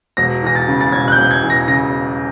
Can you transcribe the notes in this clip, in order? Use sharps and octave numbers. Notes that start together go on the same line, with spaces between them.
E1 A#6
E2 A#6
A6
C#3
A6
E1 G#6
F#6
G6
E1
G#6
E2
A#6
C#3 A#6